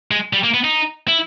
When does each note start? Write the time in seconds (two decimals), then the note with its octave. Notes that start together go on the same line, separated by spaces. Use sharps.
0.11 G#3
0.33 G3
0.44 A#3
0.54 B3
0.64 D#4
1.08 E4